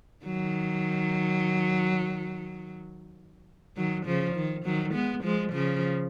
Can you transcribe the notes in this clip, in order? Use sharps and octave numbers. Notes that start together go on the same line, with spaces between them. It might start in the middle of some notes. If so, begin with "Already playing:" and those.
D#3 F#3
D#3 F#3
C#3 F3
D#3
D#3 F#3
G#3 B3
F3 G#3
C#3 F3